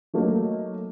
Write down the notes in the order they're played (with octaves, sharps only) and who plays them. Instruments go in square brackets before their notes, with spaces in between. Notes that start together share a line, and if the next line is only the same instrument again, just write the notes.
[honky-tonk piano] F#3 A3 A#3 D#4